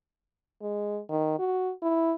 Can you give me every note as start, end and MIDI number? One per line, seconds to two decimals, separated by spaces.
0.62 0.99 56
1.10 1.35 51
1.39 1.72 66
1.82 2.14 64